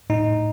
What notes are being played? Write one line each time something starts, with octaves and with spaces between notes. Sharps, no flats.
A2 D#4